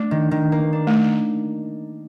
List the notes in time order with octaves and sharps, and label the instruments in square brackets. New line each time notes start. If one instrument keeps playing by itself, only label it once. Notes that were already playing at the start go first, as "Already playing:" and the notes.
Already playing: [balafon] A3 [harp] D4
[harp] D#3
D#3
A#3
D4
[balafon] A3